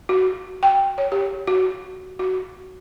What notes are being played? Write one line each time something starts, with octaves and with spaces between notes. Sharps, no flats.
F#4
G5
C#5
G4
F#4
F#4